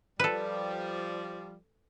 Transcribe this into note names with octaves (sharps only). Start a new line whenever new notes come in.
F3 G3 A4 B4